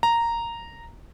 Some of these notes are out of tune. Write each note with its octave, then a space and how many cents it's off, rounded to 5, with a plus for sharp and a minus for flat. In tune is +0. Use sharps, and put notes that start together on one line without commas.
A#5 -5